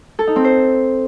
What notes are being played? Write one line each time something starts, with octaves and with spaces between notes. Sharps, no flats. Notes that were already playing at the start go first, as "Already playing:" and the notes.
A4
D#4
C4
C5